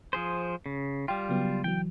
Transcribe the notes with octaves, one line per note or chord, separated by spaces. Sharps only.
F3 G#4 C5
C#3
G3 F4 G5
C#3 F#3 B3
E3 F#3 G5